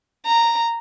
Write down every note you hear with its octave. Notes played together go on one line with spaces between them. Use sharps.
A#5